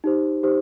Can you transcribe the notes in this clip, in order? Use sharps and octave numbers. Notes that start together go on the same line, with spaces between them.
D#4 G4 C5
D#4 G4 C5